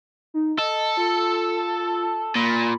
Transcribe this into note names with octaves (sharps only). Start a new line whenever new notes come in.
D#4
A4 D#5
F4
A#2 B5